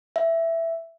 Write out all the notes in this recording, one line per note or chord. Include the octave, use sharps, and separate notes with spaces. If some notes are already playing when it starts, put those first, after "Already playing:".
E5